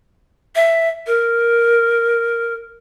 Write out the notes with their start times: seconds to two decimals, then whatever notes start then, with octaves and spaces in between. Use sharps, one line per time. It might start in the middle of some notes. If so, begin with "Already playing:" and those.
0.55 E5
1.07 A#4